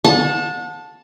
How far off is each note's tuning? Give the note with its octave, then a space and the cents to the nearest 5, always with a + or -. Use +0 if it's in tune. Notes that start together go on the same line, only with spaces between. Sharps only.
F#5 -40 A5 +0